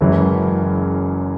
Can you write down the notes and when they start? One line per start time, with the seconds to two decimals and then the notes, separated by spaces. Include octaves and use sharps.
0.01 F#1 F#2 E3 G#3